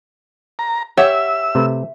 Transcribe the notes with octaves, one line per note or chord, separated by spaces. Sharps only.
A#5
G4 C#5 E5 F#5 E6
C3 A3 B4